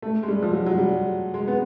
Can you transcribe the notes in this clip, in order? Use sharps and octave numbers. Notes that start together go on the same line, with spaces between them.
A3
G#3
G3
F3
F#3
F#3
G3
G#3
B3